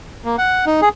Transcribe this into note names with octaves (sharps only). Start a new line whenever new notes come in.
A#3
F#5
D#4
G#4